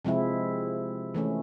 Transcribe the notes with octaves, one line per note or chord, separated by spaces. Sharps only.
C3 F3 G#3 C4 E4
E3 A3 C#4